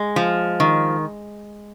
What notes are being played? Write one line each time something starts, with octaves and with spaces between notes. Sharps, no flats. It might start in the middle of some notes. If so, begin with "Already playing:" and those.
Already playing: G#3
F3
D#3